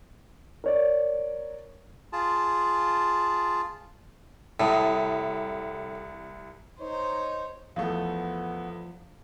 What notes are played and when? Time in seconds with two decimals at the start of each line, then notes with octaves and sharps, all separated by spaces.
0.64 A#4 C#5 D5
2.13 F4 G#4 A5
4.60 C2 A2 A5 D#6
6.81 D#4 C5 C#5
7.76 E2 F3 A3 B3 F5